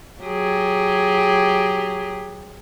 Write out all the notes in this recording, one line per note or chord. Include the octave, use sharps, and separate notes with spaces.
F#3 G4 G#4